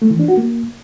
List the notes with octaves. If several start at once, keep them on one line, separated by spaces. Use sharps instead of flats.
A3
E3
D4
F#4
A#3